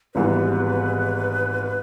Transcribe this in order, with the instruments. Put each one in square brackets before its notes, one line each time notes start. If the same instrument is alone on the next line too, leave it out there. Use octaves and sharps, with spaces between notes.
[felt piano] G#1 G#2 E3 G3 B3 [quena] B4